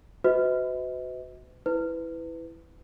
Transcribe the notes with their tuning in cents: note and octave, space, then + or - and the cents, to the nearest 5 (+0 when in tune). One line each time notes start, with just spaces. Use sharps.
F#4 +0 B4 +40 D#5 +40
E4 +0 B4 +20